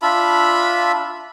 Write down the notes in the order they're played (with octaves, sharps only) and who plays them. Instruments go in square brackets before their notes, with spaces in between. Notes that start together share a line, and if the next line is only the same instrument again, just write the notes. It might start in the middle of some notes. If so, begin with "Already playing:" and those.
[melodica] D4 F4 E5 B5